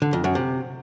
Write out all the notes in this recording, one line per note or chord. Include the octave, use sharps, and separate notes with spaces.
D3
F2
F#2
C3